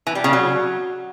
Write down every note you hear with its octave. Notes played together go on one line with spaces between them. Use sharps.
E3
G3
C#3
F#3